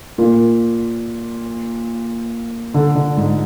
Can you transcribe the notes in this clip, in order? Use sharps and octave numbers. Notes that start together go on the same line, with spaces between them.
A#2
D3
D3
G#2